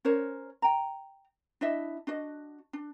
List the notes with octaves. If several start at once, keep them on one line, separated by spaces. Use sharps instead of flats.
C#4 A#4 C5 C#5
G5 A#5
D4 E4 D#5 E5
D4 F#4 D#5
D4